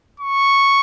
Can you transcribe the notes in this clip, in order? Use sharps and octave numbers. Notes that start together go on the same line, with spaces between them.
C#6